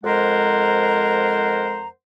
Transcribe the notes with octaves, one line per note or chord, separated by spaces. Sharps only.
F2 G#3 A#4 C5 F#5 A#5